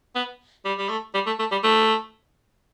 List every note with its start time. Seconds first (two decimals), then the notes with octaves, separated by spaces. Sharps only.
0.15 B3
0.65 G3
0.78 G3
0.89 A3
1.14 G3
1.26 A3
1.39 A3
1.51 G3
1.64 A3